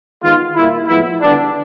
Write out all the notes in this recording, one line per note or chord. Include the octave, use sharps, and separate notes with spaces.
D#3 G#3 B3 F4
A#2 G3 A#3 E4
A2 F3 G#3 B3 E4
D3 G3 B3 D4